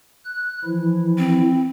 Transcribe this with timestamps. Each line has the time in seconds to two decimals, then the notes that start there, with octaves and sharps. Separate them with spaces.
0.24 F#6
0.65 E3 F3 E4
1.18 C4